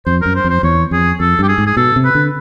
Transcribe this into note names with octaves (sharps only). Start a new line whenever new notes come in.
F2 C5
F#2 A#4
C5
F2
C5
E2 C#5
F2 G#4
F2 A4
G2 G4
G#4
G#2
G#4
B2 A4
C3
B4
D3